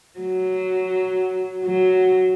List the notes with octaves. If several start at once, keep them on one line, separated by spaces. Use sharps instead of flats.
F#3
F#3